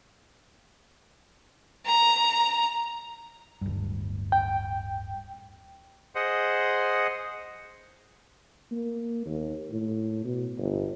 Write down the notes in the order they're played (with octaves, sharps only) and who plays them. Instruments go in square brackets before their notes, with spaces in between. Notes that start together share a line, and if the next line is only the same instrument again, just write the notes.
[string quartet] A#5
[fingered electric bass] D1 G2
[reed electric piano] G5
[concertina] G#4 C5 D#5 F#5
[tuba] A#3
D#2
A2
B2
G1